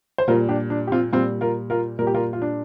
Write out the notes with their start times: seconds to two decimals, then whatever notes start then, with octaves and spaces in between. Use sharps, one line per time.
0.18 C5
0.28 A#2 G3 F4 A#4
0.49 D4 G4
0.70 D4
0.87 G4
0.92 C4 F4
1.13 A#2 G3 C4 F4
1.41 F4 A#4
1.70 F4 A#4
1.99 A#2 G3 A#4
2.07 G4
2.15 F4 A#4
2.33 F4
2.42 D4